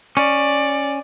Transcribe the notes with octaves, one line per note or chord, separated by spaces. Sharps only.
C#4 D5